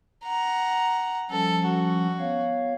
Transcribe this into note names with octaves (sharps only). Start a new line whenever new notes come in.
F#5 A#5
F3 G3 C#4 A4
F#4
B3 C#5 F5